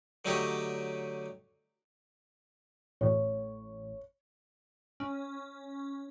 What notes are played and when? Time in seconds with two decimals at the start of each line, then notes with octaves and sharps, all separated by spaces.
0.25 D3 F#3 A3 D#4 G4 C#5
3.01 A1 A2 C#5
5.00 C#4